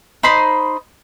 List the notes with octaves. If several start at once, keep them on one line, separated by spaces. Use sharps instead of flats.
D#4 C5 B5 C6